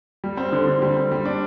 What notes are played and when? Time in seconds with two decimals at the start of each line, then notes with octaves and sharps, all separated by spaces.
0.24 G3
0.37 C4
0.52 D3
0.67 D3
0.82 G3
0.97 C4
1.11 G3
1.25 D4